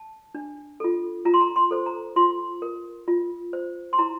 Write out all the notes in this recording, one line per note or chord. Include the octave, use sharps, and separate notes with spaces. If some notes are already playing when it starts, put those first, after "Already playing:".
Already playing: A5
D4
F4 A4
F4 A#5
C6
A#5
C6
A4 C5
A#5
F4 C6
A#4
F4
C5
C6
E4 A#5